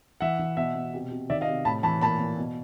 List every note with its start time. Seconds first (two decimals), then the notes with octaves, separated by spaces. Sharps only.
0.21 E3 E5 F#5
0.39 E3
0.57 B2 E5 F#5
0.75 B2
0.94 C3
1.11 C3
1.30 D#3 D5 E5
1.41 D#5 F5
1.47 C3
1.65 A2 A5 B5
1.83 E3 A5 B5
2.01 A#2 A5 B5
2.20 A#2
2.38 B2